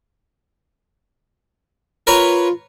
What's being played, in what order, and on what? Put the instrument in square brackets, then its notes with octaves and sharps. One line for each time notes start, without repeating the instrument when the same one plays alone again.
[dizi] F4 [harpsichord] A#4 B4 C#5